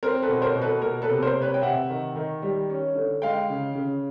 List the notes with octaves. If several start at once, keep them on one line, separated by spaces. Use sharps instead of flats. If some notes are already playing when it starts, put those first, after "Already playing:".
C4 A#4
A4 B4
B2
A#4 C5
B2
A4 B4
A#3 A#4
A4 B4
C3
A#4 C5
C3
B4 C#5
G5
C3 E5 F#5
D#3
D#3
G3
C#4
D3
G#3 F5 G5
C#3
C#3